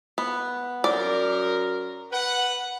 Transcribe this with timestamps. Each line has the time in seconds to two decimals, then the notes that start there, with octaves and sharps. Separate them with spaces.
0.18 B3
0.84 F#2 A#4 D5
2.12 B4 F#5